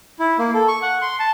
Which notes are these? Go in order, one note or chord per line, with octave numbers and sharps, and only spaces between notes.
E4
A#3
A4
C#6
F#5
C6
A5